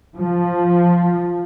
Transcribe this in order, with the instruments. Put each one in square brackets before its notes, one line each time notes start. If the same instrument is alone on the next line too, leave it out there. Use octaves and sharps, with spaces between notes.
[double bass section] F3